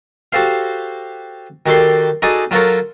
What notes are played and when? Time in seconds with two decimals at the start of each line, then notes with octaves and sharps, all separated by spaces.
0.33 F#4 G4 A4 C5 F5
1.66 D#3 F#4 G4 A4 D5 C6
2.22 D#4 F#4 G#4 A4 D5 D#6
2.51 F#3 F4 F#4 A4 A#4 C#5